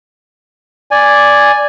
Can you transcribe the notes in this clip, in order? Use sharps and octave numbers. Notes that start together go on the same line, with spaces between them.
D5 G#5